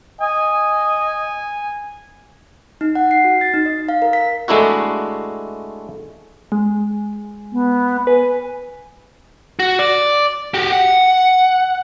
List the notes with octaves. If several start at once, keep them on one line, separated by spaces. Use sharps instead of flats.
D#5 G#5
D#4
F#5
C7
F#4
A6
D#4
D#5
F5
A#4
B6
G#3 A3 D4 E4 F#4
G#3
B3
B4 G#5
F#4
D5
F#4 G4
F#5